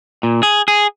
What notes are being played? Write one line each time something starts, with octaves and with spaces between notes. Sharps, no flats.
A#2
G#4
G#4